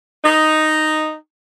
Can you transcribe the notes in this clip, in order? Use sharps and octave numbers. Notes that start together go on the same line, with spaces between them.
D#4